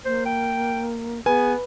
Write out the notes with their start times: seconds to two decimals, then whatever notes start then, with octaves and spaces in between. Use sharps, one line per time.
0.05 A#3 C5
0.26 G5
1.26 B3 G#4 B4 G#5